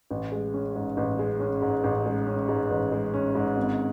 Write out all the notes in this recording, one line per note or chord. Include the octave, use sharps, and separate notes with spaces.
A1
G#3
C#4
G#2
A1
G#3
C#4
G#2
A1
G#3
C#4
G#2
A1
G#3
C#4
G#2
G#1